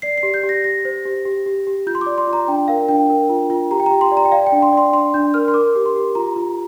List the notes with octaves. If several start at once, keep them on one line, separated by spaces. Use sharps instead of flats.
D5 C7
C7
G4
G6
G4
A#6
G4 A#6
C5
G4
G4
G4
G4
F4 G6
C6
D6
D5
C6
F4
A#5
D4 G5
A#4 F5
D4 G5
A#4
F4
F4
G4 A#5
G5
G4 A#5
C6
D5
A#5
G5
D5 F5
G5
D4
C6
D5 C6
D4 C6
D4 G6
A#4 F6
C6
A#4 D6
G4
C6
G4
F4 A#5
F4